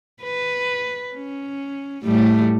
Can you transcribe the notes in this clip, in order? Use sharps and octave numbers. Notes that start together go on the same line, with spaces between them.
B4
C#4
A2 G3 A3